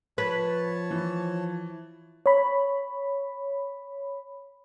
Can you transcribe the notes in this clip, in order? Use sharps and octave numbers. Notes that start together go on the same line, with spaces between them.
F3 B4 C#5 A5
E3
C#5 B5